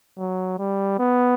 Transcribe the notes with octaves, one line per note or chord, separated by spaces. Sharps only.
F#3
G3
B3